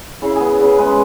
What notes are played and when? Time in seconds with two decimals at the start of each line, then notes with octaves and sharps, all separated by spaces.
0.22 C#3 E4
0.36 B3 G#4
0.60 C#3 B4
0.78 G#3 B4